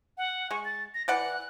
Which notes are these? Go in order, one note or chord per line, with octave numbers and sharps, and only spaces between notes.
F#5
G#3 C#6
A6
A#6
E3 D5 F#5 F#6